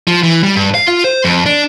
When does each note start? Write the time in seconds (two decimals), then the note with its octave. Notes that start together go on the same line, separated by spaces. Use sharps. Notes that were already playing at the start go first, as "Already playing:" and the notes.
0.08 F3
0.23 E3
0.43 G3
0.56 G2
0.75 F5
0.87 F4
1.04 C5
1.25 F2
1.46 D4